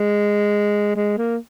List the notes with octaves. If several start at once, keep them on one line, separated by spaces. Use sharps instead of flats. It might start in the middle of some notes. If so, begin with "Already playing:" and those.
Already playing: G#3
G#3
A#3